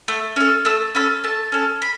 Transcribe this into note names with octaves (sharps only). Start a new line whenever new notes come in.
A3
C#4 A4
A3 E6
C#4 A4 B5
A3 A5
C#4 A4
B5